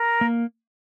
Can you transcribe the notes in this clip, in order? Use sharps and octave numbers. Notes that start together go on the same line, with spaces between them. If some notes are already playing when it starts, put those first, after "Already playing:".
Already playing: A#4
A#3